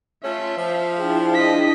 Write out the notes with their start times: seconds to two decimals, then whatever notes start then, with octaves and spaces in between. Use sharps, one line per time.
0.24 A3 C#4 F4 E5 C6
0.57 F3 F5
0.98 D4 E4 G#4 G5
1.34 D#5 B6